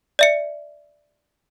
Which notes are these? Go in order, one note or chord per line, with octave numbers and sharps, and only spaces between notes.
D5 E5 C#7